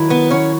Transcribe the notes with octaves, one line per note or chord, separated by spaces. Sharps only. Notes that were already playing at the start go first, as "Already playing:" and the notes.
Already playing: D#3 F#3 E4
B3 B4
C#4 C#5